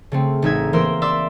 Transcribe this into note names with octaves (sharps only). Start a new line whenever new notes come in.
C#3 A3 C4
A1 D#4 E5 G#6
E3 A#3 A#4 C5 C6 E6
D5 E5 C6 D6 E6